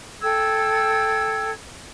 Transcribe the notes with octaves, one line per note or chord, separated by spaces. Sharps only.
A4 G5 E6 G#6